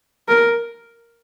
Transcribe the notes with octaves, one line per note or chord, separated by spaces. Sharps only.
A#4